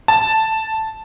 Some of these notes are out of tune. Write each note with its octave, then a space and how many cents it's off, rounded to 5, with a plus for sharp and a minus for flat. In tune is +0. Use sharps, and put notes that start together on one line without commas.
A5 +0